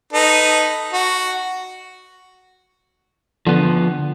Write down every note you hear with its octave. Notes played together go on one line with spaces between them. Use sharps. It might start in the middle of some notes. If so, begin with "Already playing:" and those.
D#4 A4 B4
F#4
D3 F3 B3